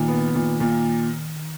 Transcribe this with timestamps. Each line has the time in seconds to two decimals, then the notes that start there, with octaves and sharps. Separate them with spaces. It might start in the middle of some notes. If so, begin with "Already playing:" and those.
Already playing: A#2 D#3
0.08 B3
0.35 A#2
0.60 A#2